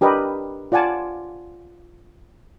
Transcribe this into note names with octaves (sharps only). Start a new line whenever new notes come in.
D4 G4 A#4 B4 D#5
F4 D5 F#5 G#5 A5